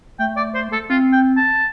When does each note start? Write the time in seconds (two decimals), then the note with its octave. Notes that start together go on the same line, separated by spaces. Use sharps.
0.19 A3 G5
0.37 D5
0.54 C5
0.72 A4
0.89 C4 F4
1.12 G5
1.37 A5